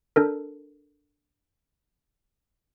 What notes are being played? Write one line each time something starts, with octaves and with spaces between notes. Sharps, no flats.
D4 A4 A#4